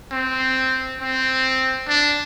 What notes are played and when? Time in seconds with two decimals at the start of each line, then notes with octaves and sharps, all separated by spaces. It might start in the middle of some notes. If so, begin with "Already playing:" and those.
0.12 C4
1.00 C4
1.88 D4